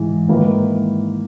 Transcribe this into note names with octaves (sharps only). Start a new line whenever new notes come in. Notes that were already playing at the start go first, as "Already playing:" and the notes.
Already playing: G#2 E3 G#3
G#2 D#3 A#3 E4 B4